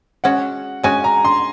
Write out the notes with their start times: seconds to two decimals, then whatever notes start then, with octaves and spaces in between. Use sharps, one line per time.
0.24 G#3 C#4 F#4 F#5
0.83 G#3 C#4 F#4 G#5
1.04 A#5
1.25 C6